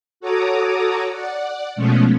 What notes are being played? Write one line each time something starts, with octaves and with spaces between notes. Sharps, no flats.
F#4 A4 C#5 A#5 D6 D#6
D5 F#5
B2 F3 G#3 A3 B3 C#4